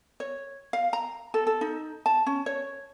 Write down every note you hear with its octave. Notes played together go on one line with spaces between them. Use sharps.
C#5
F5
A#5
A4
A4
D#4
A5
C#4
C#5